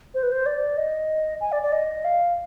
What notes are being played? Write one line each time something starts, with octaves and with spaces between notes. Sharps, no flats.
C5
B4
C5
D5
D#5
G#5
D5
D5
D#5
F5